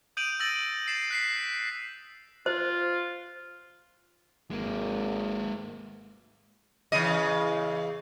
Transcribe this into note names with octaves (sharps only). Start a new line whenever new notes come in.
D#6 G6 D7 D#7 F7 F#7
E6 G6 A6 A#6 F#7
A6 C7 E7
F#6 B6 C7
F4 C5
G#1 G#3 A#3
E2 C#3 D#5